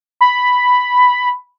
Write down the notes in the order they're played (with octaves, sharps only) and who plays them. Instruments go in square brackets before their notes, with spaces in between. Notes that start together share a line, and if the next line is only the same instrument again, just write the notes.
[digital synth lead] B5